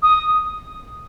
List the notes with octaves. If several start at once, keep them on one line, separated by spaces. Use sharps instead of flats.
D#6